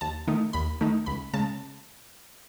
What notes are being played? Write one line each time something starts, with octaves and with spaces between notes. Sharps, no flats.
D#2 A5
D#3 A3 D#4
D#2 B5
D#3 A3 D#4
C#2 B5
C#3 G#3 A5